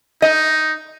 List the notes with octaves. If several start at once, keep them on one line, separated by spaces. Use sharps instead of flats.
D#4 D#5